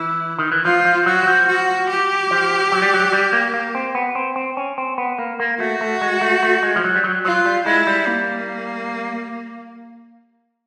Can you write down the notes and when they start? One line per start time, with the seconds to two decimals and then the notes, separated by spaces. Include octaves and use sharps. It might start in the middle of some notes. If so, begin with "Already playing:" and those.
Already playing: E3 E4
0.39 D#3
0.52 E3
0.65 F3 F4
0.85 F3
1.06 F#3 F#4
1.23 F#3
1.27 F3
1.48 F#4
1.89 G4
2.31 F3
2.72 F#3
2.82 G3
2.94 F#3
3.13 G3
3.33 A#3
3.54 A#3
3.75 C4
3.95 B3
4.15 C4
4.36 C4
4.57 C#4
4.78 C4
4.98 B3
5.19 A#3
5.40 A#3
5.60 A3 F#4
5.81 A3
6.01 G#3
6.21 A3
6.43 A3
6.63 G#3
6.76 F3
6.84 F#3
6.96 G3
7.04 F#3
7.25 F#3 F4
7.46 G3
7.66 G#3 E4
7.87 G3
8.07 A#3